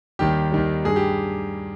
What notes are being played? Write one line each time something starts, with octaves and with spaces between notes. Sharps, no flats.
D#2 D#3 G3 G4
D#2 D#3 G3
G2 G3 G#4
G4